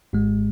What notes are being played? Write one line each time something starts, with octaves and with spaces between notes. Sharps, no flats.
G#1 G#2 G#3